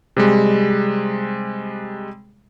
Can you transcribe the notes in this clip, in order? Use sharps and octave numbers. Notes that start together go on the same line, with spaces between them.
C3 G3 G#3